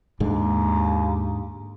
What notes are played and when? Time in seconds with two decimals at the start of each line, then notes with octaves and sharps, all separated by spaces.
0.20 D#2 G#2 D3 G#3